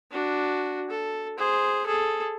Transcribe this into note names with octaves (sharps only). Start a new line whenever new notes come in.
D4 F#4
A4
G#4 C5
G#4 A4